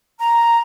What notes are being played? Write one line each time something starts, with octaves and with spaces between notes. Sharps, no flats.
A#5